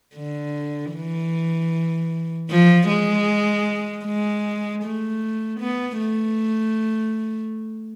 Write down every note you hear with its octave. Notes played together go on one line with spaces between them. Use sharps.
D3
E3
F3
G#3
G#3
A3
B3
A3